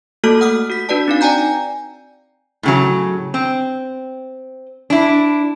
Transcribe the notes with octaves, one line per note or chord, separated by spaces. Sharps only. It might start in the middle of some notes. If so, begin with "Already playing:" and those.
A3 A#3 F#4 A4 A5 F6
F#5 D#6 F6
F#4 B6
D4 F#4 B4 D5 A5
C4 D#4 F5
D5 G5 G#5 A#5 G6
A2 C#3 F#3
C4
D4 E4